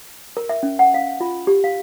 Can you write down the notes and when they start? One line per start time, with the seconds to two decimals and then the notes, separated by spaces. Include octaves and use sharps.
0.37 A#4
0.49 E5
0.63 C#4
0.79 F#5
0.94 F5
1.21 F4
1.47 G4
1.64 F5